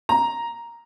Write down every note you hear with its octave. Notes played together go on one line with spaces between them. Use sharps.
A#5